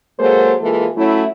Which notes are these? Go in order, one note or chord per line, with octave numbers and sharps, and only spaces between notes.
F#3 G#3 A#3 G#4 A4 C5
E3 G#3 A#3 F4 A4
F#3 A3 C#4 E4